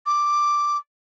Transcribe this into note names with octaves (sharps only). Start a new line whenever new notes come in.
D6